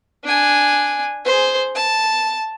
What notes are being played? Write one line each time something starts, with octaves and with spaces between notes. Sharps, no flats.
D4 G#5
G#4 C5
A5